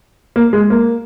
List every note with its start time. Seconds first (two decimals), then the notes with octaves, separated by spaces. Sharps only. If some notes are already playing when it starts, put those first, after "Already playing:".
0.36 A#3
0.53 G#3
0.70 A#3